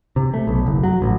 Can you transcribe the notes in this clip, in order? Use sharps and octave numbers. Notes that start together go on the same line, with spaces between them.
C3
A3
B1
F#1
F#3
A1